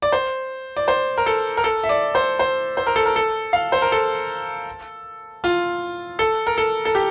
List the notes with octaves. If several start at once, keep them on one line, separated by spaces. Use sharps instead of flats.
D5
C5
D5
C5
A#4
A4
A#4
A4
E5
D5
C5
C5
C5
A#4
A4
A#4
A4
F5
C5
A#4
A4
F4
A4
A#4
A4
A4
G4